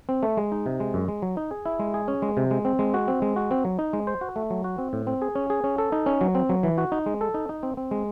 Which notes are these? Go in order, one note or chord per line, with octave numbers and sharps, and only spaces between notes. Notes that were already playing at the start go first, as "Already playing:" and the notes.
C4
A3
G#3
D#4
C3
G#3
F#2
G#3
F#3
D#4
G#4
E4
G#3
G#4
C#4
G#3
C3
G#3
C4
G#3
F#4
C4
G#3
F#4
C4
F#3
D#4
G#3
C5
F#4
A3
F#3
F#4
C4
A2
C4
G#4
C#4
G#4
C#4
A4
D#4
C#4
F#3
C4
F#3
E3
F#4
D#4
G#3
A4
D#4
D#4
C4
C4
G#3